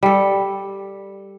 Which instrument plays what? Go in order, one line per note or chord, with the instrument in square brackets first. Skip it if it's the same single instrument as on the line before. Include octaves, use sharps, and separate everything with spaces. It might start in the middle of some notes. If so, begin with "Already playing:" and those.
[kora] G3 A4